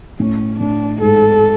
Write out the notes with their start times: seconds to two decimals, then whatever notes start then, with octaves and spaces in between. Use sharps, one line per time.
0.19 A2 C#4
0.60 A2 D4
1.02 G#2 A4